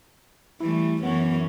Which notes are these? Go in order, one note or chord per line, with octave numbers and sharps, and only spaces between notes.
E3 G3 A3 E4
F#2 E3 B3 C#4